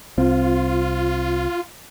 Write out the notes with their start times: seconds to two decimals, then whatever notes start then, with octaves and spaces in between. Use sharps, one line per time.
0.18 C2 C4 F4